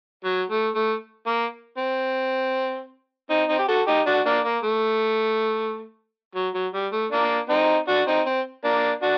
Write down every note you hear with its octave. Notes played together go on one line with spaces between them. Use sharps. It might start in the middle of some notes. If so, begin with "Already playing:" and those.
F#3
A3
A3
A#3
C4
C4 D#4
C4 D#4
G4
F#4 A4
D#4 G4
D4 F#4
A#3 D4
A#3
A3
F#3
F#3
G3
A3
A#3 D4
C4 D#4
D4 F#4
C4 D#4
C4
A#3 D4
D4 F#4